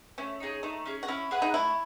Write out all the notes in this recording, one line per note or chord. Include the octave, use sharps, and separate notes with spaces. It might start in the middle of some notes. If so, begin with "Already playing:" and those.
A3 C#4
D#4 G#4 C#5
A3 D#4
C#4 G#4
F#4
C#4 E4
G#4 B4 F#5
D#4
A3 E4